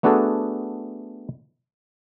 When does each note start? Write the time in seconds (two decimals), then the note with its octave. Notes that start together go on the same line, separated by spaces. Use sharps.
0.03 A3 B3 D4 F#4 G#4 A4